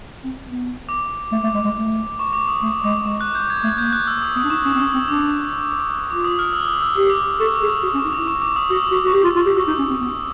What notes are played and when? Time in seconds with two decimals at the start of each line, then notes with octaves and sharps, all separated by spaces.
0.24 C4
0.46 B3
0.89 D6
1.32 A3
1.44 A3
1.54 G#3
1.65 G#3
1.76 A3
2.19 C#6
2.33 D6
2.48 D#6
2.63 A3
2.84 G#3 D6
3.04 G#3 C#6
3.21 F#6
3.35 G6
3.50 G#6
3.64 A3 G#6
3.78 A#3 G6
3.93 F#6
4.07 E6
4.22 D#6
4.36 B3 D#6
4.44 D4
4.50 D#4 C#6
4.65 C#4 D#6
4.74 C4
4.80 C#4 E6
4.94 C4 E6
5.08 D4 D6
6.10 F4 D6
6.24 D#6
6.39 F6
6.53 E6
6.68 D#6
6.82 E6
6.96 G4 D#6
7.10 D6
7.24 D#6
7.40 A4 C#6
7.55 D6
7.62 G#4
7.68 D#6
7.83 F#4 D#6
7.94 C#4
7.98 C#6
8.06 D#4
8.13 D6
8.16 E4
8.27 C#6
8.42 D6
8.56 D#6
8.70 F#4 E6
8.92 F#4
9.04 F#4
9.14 G4
9.24 F4
9.36 F4
9.46 G4
9.57 F#4 E6
9.68 D#4
9.79 C#4
9.90 C4
10.01 B3